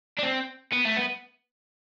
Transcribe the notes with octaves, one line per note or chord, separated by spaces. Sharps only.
D4
C4
B3
A3
B3